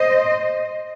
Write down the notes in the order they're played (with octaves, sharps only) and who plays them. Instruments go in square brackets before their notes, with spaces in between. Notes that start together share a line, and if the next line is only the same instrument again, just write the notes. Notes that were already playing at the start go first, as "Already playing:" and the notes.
Already playing: [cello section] C5 D#5